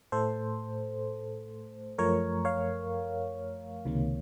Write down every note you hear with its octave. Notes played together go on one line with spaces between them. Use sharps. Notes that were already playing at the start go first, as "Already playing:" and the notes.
A2 A3 A4 C5
F#2 F3 A3 A#4 C#5
C#5 F5
C#2 C3 D#3 A#3